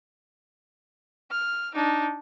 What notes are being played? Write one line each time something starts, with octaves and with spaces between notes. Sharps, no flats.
F6
D4 D#4